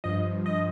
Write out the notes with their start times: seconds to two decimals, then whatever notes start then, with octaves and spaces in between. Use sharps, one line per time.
0.04 G2 F3 D#5
0.46 D#5